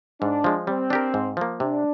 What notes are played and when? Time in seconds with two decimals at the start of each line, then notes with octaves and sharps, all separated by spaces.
0.21 G#2 D4
0.44 F3 G#3
0.67 G3 C4
0.90 D4 G4 A#4
1.14 G#2
1.37 F3 A#3
1.60 C3 D4